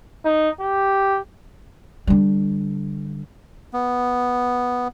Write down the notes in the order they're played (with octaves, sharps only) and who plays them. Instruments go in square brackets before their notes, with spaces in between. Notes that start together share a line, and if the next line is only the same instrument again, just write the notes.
[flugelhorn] D#4
G4
[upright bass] D3 G3
[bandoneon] B3